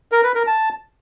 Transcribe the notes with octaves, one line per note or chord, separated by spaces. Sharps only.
A#4
B4
A#4
A5